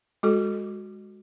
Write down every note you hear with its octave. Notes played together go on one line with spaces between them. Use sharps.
G#3 F#4 A4